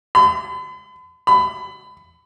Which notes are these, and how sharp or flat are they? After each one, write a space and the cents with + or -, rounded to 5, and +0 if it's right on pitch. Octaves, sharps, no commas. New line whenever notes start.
B5 +45
B5 +25